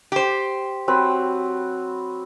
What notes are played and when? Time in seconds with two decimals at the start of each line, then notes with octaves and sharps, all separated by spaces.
0.12 G4 C5
0.88 F#3 C4 B4